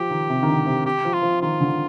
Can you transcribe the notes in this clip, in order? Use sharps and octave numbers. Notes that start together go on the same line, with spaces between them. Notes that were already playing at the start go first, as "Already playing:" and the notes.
Already playing: F3 G4
D#3
C3
D#3
D3
C3
G4
F3
F4
F3
D#3 F4
D3